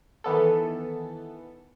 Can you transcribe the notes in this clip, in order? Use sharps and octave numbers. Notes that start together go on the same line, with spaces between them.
D#3 E3 B3 A4